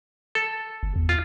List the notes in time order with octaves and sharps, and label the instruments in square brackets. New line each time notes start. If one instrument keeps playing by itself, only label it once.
[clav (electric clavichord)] A4
[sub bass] G1
E2
[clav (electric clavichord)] F4